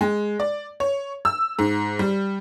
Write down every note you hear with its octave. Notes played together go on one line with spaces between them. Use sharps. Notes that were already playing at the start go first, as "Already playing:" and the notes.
G#3
D5
C#5
E6
G#2
G3